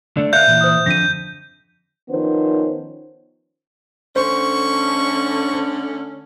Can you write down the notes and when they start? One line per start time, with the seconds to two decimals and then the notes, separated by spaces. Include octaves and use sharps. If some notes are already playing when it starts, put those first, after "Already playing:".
0.17 D3 A3 D4 D5
0.33 A#4 C#5 E5 F5 F#6 G6
0.47 A#2 E3
0.61 C5 E5 D#6
0.86 F2 D3 A#6 B6 D#7
2.10 D#3 F3 B3 C#4 C5
4.16 D3 A3 C#4 C5 C#6